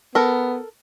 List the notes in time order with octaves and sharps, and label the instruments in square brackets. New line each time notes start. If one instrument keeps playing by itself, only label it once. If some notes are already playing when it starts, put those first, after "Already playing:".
[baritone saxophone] B3 [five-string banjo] A4 A#4